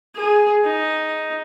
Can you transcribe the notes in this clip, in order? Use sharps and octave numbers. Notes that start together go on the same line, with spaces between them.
G#4
D#4